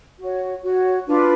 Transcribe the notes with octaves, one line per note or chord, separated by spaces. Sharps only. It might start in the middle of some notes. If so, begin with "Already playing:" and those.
F#4 C#5
F#4 C#5
D4 F4 B4